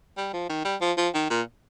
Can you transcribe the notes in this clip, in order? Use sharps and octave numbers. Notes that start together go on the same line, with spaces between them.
G3
F3
D#3
G3
F3
F3
D#3
A#2